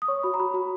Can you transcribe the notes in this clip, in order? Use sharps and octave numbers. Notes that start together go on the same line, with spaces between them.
D#6
C#5 C#6
F#4 B5
A#5
F#4 B5
F#4 A#5